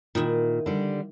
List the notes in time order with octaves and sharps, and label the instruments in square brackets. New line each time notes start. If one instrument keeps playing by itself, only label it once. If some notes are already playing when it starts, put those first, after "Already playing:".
[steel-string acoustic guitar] A#2 [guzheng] D#3 E4
[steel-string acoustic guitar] D3 G3